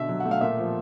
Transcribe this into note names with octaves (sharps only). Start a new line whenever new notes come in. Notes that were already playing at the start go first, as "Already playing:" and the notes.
Already playing: B2 D3 E5
F#3
F#5
A3
F5
A#2 E5
F3